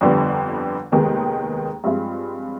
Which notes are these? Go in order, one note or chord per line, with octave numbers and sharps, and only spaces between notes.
G1 F2 D3 G3 B3
F1 D#2 D#3 G#3 B3
G2 F3 G#3 C4 F4